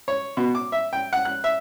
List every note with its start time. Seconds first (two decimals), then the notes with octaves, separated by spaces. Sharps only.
0.08 C#5
0.37 B2
0.55 D6
0.72 E5
0.93 G5
1.13 F#5
1.25 F#6
1.44 E5